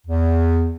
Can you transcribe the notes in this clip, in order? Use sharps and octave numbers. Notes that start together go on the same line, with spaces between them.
E2